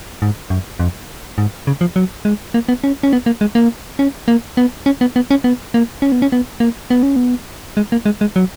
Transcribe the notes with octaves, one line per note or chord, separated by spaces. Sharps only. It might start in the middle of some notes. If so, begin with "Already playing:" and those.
G#2
F#2
F2
G#2
C#3
F3
F#3
G#3
A#3
B3
C#4
C#4
B3
A#3
G#3
A#3
C#4
A#3
B3
C#4
B3
B3
C#4
B3
A#3
C#4
B3
C#4
B3
A#3
B3
C#4
B3
G#3
A#3
G#3
G#3
F#3